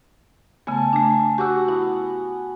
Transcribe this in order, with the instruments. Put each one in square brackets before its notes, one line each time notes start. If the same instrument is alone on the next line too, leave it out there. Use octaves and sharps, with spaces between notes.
[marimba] C#3 A3 B3 [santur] G#5 A5
[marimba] A3 D4
[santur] F#4 F#5 [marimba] G4 D6 E6
[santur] B3 [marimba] E4